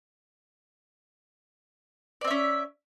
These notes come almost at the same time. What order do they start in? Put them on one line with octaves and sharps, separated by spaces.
D5 C4 E5 C#4